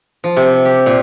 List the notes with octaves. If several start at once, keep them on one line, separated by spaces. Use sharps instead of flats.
F3
C3
G4
A#2